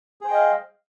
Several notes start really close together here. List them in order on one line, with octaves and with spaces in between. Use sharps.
G#4 C5 G5 D#5 F5